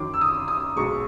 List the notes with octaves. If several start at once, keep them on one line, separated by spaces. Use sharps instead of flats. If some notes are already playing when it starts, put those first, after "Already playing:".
Already playing: F#2 D#3 F#3 D6
E6
D#6
D#6
B1 B2 G#3 C#6